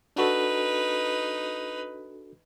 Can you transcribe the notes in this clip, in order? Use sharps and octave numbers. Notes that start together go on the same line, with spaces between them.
D4 D#4 F#4 A4 B4